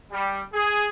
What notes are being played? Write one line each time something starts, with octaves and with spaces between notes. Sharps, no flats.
G3
G#4